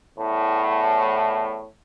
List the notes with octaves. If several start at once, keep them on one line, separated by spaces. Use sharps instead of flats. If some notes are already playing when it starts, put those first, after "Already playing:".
E2 A2